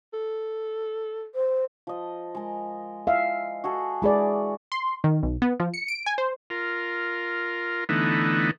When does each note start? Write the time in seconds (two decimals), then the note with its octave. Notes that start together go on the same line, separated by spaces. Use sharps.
0.14 A4
1.35 C5
1.87 F3 D#5
2.35 G#3 A#4
3.07 E5 F5
3.64 F#4 G#4 A4
4.02 E3 G#3 G#4 B4 D5
4.72 C6
5.04 D#3
5.23 B1
5.42 B3
5.60 F3
5.74 C#7
5.88 D7
6.06 G#5
6.18 C5
6.50 F4 A#4
7.89 D3 E3 A3 B3 D#4